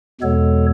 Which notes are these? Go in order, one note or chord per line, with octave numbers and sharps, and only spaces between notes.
E2 B2 G#3 B3 A4 C#5